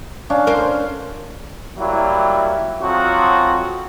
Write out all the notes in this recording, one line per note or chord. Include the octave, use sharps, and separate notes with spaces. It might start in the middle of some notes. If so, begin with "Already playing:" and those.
C#4 D4 F5
A#4 C5
F#3 G3 A#3 E4
F2 F3 F#3 C4 F#4